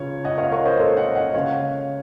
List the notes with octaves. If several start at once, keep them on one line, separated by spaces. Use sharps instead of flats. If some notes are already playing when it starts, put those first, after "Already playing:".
Already playing: C#2 C#3 C#5
D#5 F#5
C#5 F5
D#5
A#4 C#5
C5 D#5
A4 C5
D#5 F#5
D#5 F#5
C#2 C#3 C#5 F5